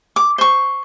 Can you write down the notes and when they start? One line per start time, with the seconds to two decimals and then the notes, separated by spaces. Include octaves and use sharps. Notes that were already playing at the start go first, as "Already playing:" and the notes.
0.16 D6
0.38 C5 C#6